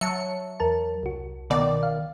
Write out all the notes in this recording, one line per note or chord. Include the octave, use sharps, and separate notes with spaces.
F#3 E5 A5 C#7
E2 A#4 A5
C2 F#4
B2 D#3 D5
F5